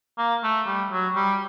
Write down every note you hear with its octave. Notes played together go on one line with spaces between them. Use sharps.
A#3
A3
G3
F#3
G3